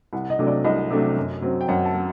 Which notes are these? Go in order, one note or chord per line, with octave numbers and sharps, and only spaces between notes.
C2 F#5
D#5
C3 F#3 A3 D4
D5
C2 D#5
C3 F#3 A3 D4
F#2
F#3 C4
G5
F#2 F#5
A5
F#3